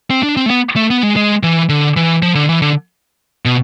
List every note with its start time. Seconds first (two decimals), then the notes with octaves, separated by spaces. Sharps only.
0.10 C4
0.23 D4
0.37 C4
0.46 A3
0.50 B3
0.76 A3
0.90 B3
1.03 G#3
1.16 G#3
1.43 E3
1.69 D3
1.97 E3
2.22 F3
2.35 D3
2.49 E3
2.62 D3
3.45 B2